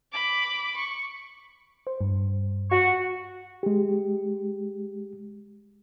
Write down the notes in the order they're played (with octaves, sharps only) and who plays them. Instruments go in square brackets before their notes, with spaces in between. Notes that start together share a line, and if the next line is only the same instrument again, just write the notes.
[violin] B5 D6
C#6
[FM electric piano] C5
G2
[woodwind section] F#4 C#6
[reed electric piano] G#3 G4